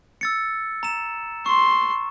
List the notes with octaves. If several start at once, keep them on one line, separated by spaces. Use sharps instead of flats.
E6 A6 C#7
A#5 E7
C6 C#6